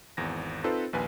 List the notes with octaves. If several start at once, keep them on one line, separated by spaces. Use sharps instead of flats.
G#1 E2 A#6
C4 D#4 F4 A4 B4 C5
A#1 D#2 B4 G#5